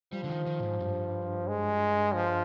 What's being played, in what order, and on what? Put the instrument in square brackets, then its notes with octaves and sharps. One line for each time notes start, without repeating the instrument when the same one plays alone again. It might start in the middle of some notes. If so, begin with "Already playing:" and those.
[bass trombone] F3 [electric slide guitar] G3
[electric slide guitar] D3
D#3
D#3
A#2
G#2
G2
[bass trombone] G#3
F3